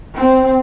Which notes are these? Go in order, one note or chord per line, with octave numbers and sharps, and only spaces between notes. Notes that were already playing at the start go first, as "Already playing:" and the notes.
C4